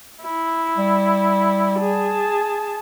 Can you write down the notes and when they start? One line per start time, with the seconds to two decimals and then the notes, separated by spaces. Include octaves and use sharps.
0.24 E4
0.78 G3
1.79 G#4 A5